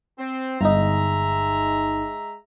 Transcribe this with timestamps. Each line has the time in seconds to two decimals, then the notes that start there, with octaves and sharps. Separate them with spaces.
0.19 C4
0.61 G1 G#3 D#4 E5 A#5